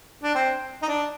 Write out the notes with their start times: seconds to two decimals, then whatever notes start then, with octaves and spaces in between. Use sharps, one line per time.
0.23 D4
0.35 C4
0.82 D#4
0.89 D4